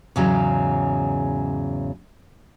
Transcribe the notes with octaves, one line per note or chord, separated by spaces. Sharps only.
E2 G#2 C#3 F#3 G#3 C#4